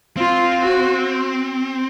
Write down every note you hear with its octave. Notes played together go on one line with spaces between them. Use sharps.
C4 F4
F#4